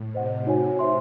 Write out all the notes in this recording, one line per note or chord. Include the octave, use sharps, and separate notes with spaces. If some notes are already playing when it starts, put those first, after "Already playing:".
Already playing: A2
C3 C5 D#5 F#5
D#4 F#4 C#5 G#5
C5 E5 C6